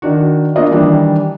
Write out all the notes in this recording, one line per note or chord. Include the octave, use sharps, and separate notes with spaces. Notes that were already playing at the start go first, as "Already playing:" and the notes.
D#3 D4 F#4
A#3 D4 F4 D#5
D#3 E3 G3 D4